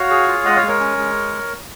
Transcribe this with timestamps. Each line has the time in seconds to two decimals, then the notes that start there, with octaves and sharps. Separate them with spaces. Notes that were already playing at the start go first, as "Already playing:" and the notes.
Already playing: F#4 C#5 F5
0.10 G#4
0.28 F4
0.45 G#3 D#5 F#5
0.56 C#5 F5
0.62 G#3
0.68 A#4 C#5
0.80 C#4
0.97 G#3